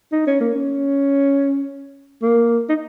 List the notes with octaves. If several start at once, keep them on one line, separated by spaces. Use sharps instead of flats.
D#4
C#4
A#3
C#4
A#3
D#4